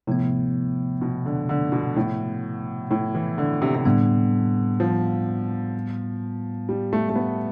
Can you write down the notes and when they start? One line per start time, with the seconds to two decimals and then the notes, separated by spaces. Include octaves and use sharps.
0.07 A2 C3 F3 B3
1.01 B2
1.26 D3
1.49 D3
1.72 B2
1.96 A2
2.91 A2
3.15 E3
3.38 D3
3.62 C3
3.75 C3
3.85 A2 D3 G3 B3
4.80 F3
6.69 G3
6.93 A3
7.09 A3
7.16 B3